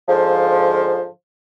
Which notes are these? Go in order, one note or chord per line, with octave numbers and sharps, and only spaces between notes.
G#2 D3 F3